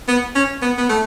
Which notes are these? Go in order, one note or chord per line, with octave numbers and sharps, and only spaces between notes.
B3
C#4
B3
B3
A3